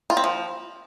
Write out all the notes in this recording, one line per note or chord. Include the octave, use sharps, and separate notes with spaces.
F4
C4
F3